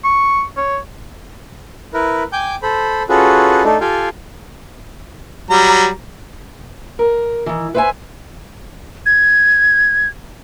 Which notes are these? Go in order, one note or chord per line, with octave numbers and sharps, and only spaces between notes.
C#6
C#5
E4 A#4 B4
G5 G#5 D6 G6
A4 C5 B5
C#4 F4 F#4 G#4 A4 B4
A3 D4 D#4 A4
F4 G4 A4 F5 G5 G#5
F#3 G3 A#5
A#4
D#3 E3
B4 C5 E5 F#5 G#5
G#6